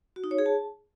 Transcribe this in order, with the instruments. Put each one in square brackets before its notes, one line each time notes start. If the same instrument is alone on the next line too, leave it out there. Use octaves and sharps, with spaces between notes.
[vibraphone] F#4
D#4
C#5
G#4
A5